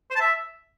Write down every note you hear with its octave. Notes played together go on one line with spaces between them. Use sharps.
C5
A5
E5